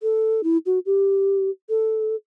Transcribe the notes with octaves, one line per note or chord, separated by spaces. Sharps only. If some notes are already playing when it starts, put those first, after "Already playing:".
A4
E4
F#4
G4
A4